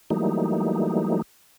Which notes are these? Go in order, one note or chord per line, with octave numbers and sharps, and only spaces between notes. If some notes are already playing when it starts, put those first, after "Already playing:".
E3 F#3 G3 A3 A#3 D#4